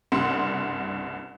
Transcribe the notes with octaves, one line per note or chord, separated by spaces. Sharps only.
F#1 C2 G2 F#5 C6 C#7